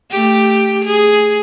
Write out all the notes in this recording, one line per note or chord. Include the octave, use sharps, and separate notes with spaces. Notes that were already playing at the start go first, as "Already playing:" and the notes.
A3 G4
G#4